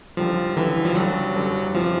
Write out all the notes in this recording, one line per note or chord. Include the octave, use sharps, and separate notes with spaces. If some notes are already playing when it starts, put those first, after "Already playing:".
F#1 F#2 D3 F3 G3
F#1 F#2 D3 E3 G3
F3
F#1 F#2 D3 F#3 G3
F#1 F#2 D3 G3
F2 C3 E3 F3